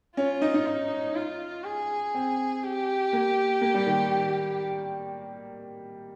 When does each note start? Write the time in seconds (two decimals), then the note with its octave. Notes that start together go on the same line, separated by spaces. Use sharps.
0.16 C#4 F4
0.42 D#4
0.54 D#4
0.67 D#4
1.15 F4
1.64 G#4
2.14 C4
2.63 G4
3.13 A#3
3.61 A#3
3.74 G3
3.86 D#3